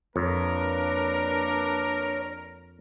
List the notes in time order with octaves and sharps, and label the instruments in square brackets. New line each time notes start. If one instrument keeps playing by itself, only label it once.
[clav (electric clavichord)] F2 [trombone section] A#3 D4 B4 [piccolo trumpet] A#4 [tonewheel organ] C#5